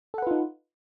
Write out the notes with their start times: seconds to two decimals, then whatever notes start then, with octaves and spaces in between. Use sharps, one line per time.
0.14 A4
0.18 F#5
0.22 B4
0.27 F4
0.31 D#4